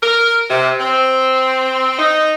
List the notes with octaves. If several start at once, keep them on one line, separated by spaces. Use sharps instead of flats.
A#4
C3
C4
D#4